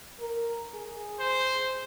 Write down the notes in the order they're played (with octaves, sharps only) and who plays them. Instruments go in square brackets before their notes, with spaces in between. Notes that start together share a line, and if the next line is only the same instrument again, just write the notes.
[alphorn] A#4
G#4
[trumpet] C5